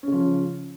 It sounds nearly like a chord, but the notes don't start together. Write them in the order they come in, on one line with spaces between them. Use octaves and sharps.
C#4 C#3 F3